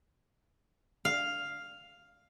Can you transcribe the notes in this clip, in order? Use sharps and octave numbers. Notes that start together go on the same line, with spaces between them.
F5